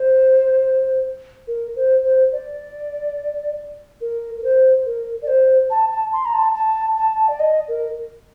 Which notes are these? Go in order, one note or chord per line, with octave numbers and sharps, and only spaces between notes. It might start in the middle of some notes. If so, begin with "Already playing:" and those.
Already playing: C5
A#4
C5
C5
D5
A#4
A#4
C5
A#4
D5
C5
A5
A5
C6
A#5
A5
A5
A5
D5
D#5
A#4